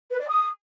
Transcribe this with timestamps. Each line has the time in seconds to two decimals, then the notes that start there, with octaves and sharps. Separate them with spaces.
0.11 B4
0.19 D5
0.27 D#6